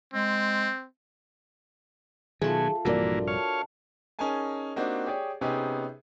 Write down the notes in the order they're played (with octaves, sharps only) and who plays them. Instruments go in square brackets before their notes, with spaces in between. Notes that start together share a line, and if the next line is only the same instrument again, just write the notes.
[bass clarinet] G#3 [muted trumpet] C4
[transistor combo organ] B2 G#5 [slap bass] D#3 F#3 [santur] A3 F4 [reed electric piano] G#4
[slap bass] A#1 G2 C3 [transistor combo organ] E3 A#3 [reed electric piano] F#4 A#4 D5
[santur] D4 [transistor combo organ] C#5 F5
[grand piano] C#4 D#4 G#4 A#4 G#5 A5
A#3 C4 D4 D#4 F#4 G4
G4 G#4 C#5 D5
C3 B3 C#4 D#4 G4 G#4